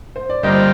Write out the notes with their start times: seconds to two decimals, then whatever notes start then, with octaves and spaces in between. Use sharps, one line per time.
0.16 C5
0.30 D5
0.43 G2 D3 G3 A#3 F4 C5 D#5